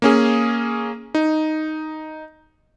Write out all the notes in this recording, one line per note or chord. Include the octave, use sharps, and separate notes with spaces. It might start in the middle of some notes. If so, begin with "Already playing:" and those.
A#3 C#4 G#4
D#4